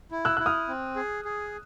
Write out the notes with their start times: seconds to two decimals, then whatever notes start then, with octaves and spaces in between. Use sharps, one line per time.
0.11 E4
0.25 E6 F#6
0.37 E4 F#6
0.46 D#6 F6
0.68 C4
0.96 G#4
1.25 G#4